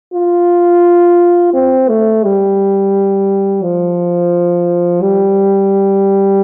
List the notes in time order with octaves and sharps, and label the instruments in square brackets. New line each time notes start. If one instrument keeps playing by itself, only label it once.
[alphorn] F4
C4
A3
G3
F3
G3